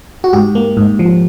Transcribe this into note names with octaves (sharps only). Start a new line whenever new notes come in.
F#4
G#2 G4
A#3
G#2
F3